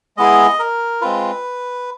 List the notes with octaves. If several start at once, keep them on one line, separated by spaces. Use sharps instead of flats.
G#3 B3 E4 G#4 D#5
A#4
G#3 C4 F4 B4